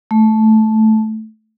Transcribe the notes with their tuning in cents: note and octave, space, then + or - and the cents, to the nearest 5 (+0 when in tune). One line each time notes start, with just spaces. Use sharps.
A3 -10